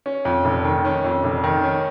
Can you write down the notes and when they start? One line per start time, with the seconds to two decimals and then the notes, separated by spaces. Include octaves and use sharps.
0.06 C#4
0.25 F2
0.45 F1
0.64 D#3
0.85 C#4
1.04 F2
1.24 F1
1.44 D#3
1.63 C#4